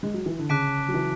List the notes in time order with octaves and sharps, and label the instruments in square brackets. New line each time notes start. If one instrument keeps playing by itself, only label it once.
[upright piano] G#3
F#3
E3
D3
[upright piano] C#3 [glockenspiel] A5 D6 F#6 B6 D7
[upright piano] F#3
E3